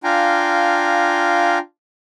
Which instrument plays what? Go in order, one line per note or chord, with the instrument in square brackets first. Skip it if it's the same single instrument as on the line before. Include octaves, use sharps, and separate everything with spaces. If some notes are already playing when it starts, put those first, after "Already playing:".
[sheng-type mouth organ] D4 F4 F5 G5 G#5 A#5